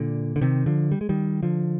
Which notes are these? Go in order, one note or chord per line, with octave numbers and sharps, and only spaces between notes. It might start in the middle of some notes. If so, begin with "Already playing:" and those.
Already playing: A#2 D3
D3
C3 D#3
D3 F3
G3
G#3
D#3 G3
D3 F3